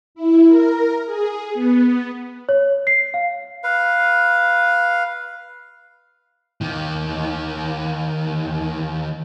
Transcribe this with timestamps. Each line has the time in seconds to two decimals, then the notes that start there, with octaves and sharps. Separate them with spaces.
0.15 E4
0.48 A#4
1.05 G#4
1.54 B3
2.49 C#5
2.87 C7
3.14 F5
3.64 B4 F5
6.61 D#2 D#3